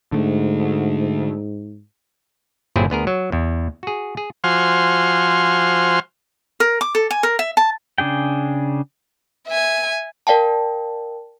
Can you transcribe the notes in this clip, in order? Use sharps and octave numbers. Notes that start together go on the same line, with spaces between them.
G#2 D3 A3
G1 A#2 F#3 C4 E4 G#4
D2 B3 G#4 A#4
F#3
E2
F#4 G#4
G#4
F3 F#4 C5 G#5 C6 F6
A#4
D6
A4
G#5
A#4
E5
A5
C#3 D4 G#4 G5
E5 G#5
A#4 D5 F5 G5 A5